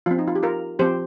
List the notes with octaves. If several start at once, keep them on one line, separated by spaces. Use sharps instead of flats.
F3 C4 F4
D#4
F4
G4
F4 A#4
F3 C4 G4 C5